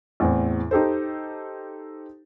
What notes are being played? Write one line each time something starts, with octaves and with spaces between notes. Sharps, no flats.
E2 A2 C4
D#4 G4 A4 C5